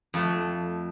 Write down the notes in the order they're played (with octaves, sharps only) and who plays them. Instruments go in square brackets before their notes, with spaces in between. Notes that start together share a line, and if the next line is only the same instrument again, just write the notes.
[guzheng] F2 A3